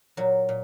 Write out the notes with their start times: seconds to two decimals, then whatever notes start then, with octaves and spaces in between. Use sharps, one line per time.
0.17 A#2 F#3
0.49 A#2